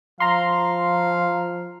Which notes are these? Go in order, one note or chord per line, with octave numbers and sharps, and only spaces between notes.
F3 F5 A#5 C6